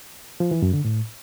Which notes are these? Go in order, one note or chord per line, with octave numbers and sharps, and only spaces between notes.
F3
E3
F#2
D3
A2